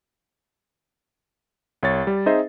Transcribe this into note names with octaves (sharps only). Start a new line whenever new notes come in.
C2 C#5 A6
G3
C4 D#4 G#4 C5 D#5 E5